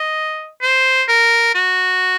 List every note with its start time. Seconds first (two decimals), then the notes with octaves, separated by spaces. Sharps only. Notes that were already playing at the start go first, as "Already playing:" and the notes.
Already playing: D#5
0.62 C5
1.08 A#4
1.55 F#4